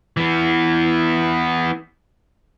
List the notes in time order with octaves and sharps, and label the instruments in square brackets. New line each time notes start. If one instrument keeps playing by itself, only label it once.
[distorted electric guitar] E3 B3